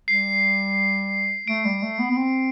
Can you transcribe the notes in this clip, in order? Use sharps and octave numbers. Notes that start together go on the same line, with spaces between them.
G3 C7
A3 D7
G3
A3
B3
B3
C4